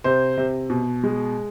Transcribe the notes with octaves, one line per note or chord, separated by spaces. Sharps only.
C3 C5
C3
B2
G#3